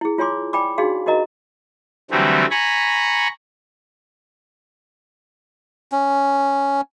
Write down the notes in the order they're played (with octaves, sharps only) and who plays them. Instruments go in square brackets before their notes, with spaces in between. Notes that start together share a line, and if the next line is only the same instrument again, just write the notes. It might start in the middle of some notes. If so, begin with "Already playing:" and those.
[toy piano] E4 G#4
F4 C#5 G#5 C6 D6
D5 G5 G#5 B5 D6
D4 D#4 F#4 G#4 F5 C6
D#4 F#4 A#4 D#5 A#5
[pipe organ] D3 E3 F#3 G3 A3 C4
G#5 A#5 B5 C#6
[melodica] C#4